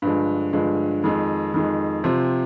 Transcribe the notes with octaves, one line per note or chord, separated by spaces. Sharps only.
G2 D3 F3 G#3
G2 D3 F3 G#3
F2 D#3 G#3
F2 D#3 G#3
C3 F3 C4